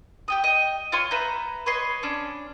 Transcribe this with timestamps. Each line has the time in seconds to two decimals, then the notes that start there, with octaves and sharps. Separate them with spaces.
0.28 G4 G5 D#6
0.44 D#5 G5
0.92 F4 C#5 C6
1.11 B4 E5 A#5 G6
1.66 B4 C#5 D#5 C6
2.03 C#4 D4